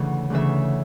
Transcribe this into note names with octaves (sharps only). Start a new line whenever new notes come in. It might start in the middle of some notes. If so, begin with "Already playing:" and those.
Already playing: D2 C#3 E3 E5 F#5
D2 C#3 E3 E5